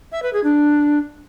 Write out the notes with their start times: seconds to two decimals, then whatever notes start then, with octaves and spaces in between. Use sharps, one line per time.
0.12 E5
0.23 B4
0.33 G#4
0.44 D4